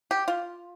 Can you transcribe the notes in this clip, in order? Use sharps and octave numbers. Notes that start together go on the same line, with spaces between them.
G4
F4